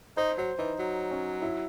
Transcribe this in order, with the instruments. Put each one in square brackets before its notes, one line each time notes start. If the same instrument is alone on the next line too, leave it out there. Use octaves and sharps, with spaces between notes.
[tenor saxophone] D#4 [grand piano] C5
[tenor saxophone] F#3 [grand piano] C5
[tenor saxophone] E3 [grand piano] D#4
[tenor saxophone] F#3
[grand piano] C#4
E4